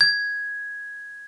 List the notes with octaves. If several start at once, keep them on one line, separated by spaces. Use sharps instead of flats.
G#6